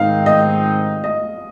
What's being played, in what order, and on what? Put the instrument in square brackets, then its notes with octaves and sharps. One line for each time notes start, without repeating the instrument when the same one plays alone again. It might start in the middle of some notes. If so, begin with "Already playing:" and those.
Already playing: [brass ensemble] G#2 D#3 C4 D#4 [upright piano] F5
[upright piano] D#5
D#5